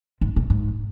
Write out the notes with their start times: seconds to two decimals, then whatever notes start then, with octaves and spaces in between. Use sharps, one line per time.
0.21 G#2
0.36 A#2
0.50 G#2